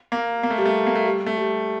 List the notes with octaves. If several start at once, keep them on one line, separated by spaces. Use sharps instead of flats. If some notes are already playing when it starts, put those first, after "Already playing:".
A#3
A#3
A3
G3
A3
A#3
A3
G3
A3
G3